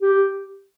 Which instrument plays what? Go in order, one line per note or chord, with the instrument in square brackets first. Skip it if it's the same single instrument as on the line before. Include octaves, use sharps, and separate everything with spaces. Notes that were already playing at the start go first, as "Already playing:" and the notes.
[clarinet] G4